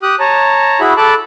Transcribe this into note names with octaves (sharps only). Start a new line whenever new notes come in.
G4 D#6 F#6
C#5 A5 A#5
E4 F#4 G#4 B5
A4 A5 B5 D6 F#6